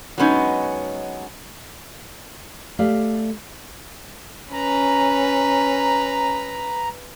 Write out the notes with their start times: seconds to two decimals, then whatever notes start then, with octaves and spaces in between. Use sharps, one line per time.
0.18 F#3 G#3 B3 C#4 D#4
2.79 A3 G4 D5 F5
4.53 C#4 B4 A#5